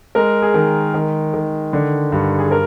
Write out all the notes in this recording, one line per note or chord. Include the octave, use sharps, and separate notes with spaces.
G#3 A#4
G#4
D#3
D#3
D#3
D3
G2
G#4
A#4